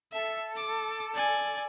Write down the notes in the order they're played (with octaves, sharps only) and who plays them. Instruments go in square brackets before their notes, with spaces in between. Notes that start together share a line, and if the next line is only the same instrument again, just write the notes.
[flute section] A4 [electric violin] E5
[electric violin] D6
D5 G#5